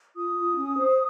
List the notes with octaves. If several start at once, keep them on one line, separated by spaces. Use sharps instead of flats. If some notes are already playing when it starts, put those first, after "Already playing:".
F4 D#6
F4
C#4
C5